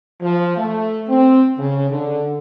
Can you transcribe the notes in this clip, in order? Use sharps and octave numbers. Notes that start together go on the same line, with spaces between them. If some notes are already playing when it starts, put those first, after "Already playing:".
F3
A3
C4
C#3
D3